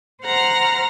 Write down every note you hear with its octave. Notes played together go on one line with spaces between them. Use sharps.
C5 F#5 A#5 F6 A#6